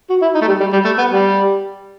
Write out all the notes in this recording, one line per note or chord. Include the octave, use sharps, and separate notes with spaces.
F#4
E4
D#4
A3
G3
G3
G3
A3
B3
G3